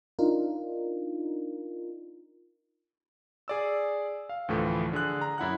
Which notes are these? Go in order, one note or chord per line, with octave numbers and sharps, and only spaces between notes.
D4 D#4 F4 A#4
G#4 D5 E6
F5
D2 A2 E3 F3 A3
D3 G#4 F#6
A#5
F#2 E4 F#5 F#6